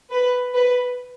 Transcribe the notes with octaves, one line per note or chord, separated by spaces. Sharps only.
B4
B4